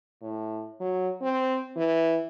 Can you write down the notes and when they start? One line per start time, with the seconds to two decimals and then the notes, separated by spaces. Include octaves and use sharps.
0.22 A2
0.80 F#3
1.22 C4
1.77 E3